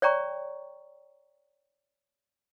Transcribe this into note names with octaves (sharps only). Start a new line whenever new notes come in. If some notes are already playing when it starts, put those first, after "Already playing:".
C#5 D5 G5 A#5 C#6